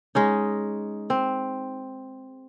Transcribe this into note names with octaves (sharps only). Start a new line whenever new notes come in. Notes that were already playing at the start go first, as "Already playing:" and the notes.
G#3 C#4 D#4
C4